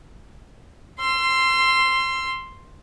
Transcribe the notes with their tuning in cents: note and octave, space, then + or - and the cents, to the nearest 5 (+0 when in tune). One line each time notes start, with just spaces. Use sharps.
C6 +0 E6 +40